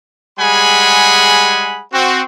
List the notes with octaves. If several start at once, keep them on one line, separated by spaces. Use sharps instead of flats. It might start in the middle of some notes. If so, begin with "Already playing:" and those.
G3 G#3 G#4 F#5 G#5 B5
C4 F#4